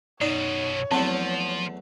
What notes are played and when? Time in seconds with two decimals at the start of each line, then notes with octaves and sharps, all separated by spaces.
0.21 F#2 B2 D#4 C#5 D5
0.92 E2 F3 F#3 A3 C4